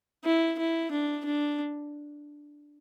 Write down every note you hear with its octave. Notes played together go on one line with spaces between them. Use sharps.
E4
E4
D4
D4